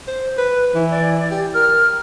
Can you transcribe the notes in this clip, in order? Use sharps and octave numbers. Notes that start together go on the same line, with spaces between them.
C5
B4
E3
D5
G4
A#4 F6